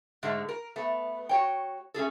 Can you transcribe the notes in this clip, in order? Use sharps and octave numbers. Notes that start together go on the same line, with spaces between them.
G#2 D3 G#3 A3
A#4
A3 B3
F#4 C#5 G5
A3 C#4 G#4 A4